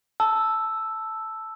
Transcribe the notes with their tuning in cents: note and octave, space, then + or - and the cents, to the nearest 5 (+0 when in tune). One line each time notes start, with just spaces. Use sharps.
A5 +0 E6 +0